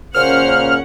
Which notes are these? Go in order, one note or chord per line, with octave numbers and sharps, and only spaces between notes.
A#2 C#3 A#3 C#4 C5 F#5 F6